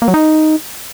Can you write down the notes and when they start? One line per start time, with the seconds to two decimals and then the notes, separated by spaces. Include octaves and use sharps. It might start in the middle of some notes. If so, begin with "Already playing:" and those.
0.02 A#3
0.08 F#3
0.14 D#4